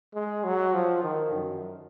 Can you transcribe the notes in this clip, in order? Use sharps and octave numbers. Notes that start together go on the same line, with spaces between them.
G#3
F#3
F3
D#3
F#2